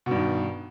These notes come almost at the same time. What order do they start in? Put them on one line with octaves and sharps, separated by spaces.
B2 G2 D#3